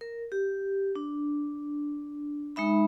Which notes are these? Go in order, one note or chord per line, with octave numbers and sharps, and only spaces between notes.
A#4
G4
D4
G#3 D#4 E5 B5